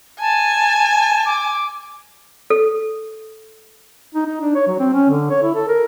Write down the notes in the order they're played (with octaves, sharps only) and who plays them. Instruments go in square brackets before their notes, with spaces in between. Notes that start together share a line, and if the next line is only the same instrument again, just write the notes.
[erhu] G#5 [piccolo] A5
[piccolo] D6
[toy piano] A4
[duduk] D#4
D#4
D4
C#5
F#3
C4
C#4
D3
C#5
E4
A4
A#4